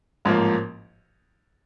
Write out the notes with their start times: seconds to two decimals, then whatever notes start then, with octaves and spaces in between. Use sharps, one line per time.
0.25 A1 G#2 F3 A#3